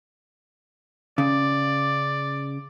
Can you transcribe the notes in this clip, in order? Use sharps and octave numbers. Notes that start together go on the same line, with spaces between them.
C#3 D5